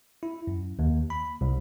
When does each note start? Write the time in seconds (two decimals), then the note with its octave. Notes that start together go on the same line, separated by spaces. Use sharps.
0.23 E4
0.47 F#2
0.79 D#2
1.10 B5
1.41 C2